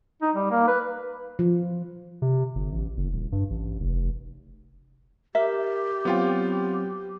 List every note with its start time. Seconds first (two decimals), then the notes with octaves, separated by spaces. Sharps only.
0.22 D#4
0.35 G3
0.51 A#3
0.68 B4
1.39 F3
2.22 C3
2.55 G1
2.72 A1
2.97 F#1
3.13 D#1
3.32 G2
3.50 A1
3.80 F1
5.35 G4 A#4 E5
6.05 F#3 B3 C4 F4 G5